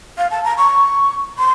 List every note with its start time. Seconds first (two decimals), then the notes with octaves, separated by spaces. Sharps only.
0.18 F5
0.31 A5
0.45 A#5
0.58 C#6
1.38 C6